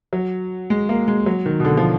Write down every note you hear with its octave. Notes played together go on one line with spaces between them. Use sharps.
F#3
G#3
A#3
G#3
F#3
D#3
B2
D3
F3